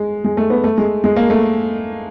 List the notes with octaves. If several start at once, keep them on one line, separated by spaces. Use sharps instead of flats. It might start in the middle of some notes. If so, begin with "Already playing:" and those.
Already playing: G#3
G#3
A3
B3
A3
G#3
G#3
A#3
A3